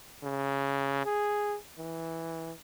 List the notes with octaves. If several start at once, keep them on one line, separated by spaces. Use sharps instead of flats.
C#3
G#4
E3